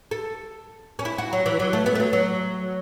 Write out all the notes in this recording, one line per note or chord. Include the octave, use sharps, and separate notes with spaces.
A4
C#4
E4
F#4
F#3
E3
F#3
A3
B3
A3
F#3
F#3